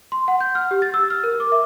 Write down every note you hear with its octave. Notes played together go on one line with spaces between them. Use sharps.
C6
F#5
G6
F6
G4
A6
E6
F6
A#4
D6
E5